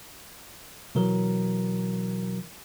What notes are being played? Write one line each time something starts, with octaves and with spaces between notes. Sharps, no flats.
B2 E3 F#3 A#4